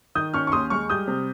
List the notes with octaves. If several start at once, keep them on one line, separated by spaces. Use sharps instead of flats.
D#3 D#6 G6
C#4 C#6 F6
C#6
D#2 C6 D#6
G#3 C#6 F6
G3 D#6 G6
C3